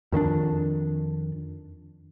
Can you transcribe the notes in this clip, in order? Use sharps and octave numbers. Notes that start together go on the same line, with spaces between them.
F2 D#3 C4 D4